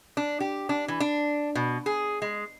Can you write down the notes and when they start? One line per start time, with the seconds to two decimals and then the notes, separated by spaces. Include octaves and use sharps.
0.17 D4
0.40 G4
0.69 D4
0.88 E3
1.00 D4
1.55 B2
1.86 G#4
2.22 G#3